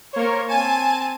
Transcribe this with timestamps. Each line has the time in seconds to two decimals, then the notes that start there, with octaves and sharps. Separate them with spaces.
0.13 A#3 A#4 C5 C#5
0.49 C4 G#5 A5 D#7